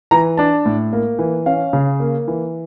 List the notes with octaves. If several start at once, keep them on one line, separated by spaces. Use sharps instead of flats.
E3 A#5
D4 A5
A2
A#3
E3
C#4 F5
C#3
A#3
E3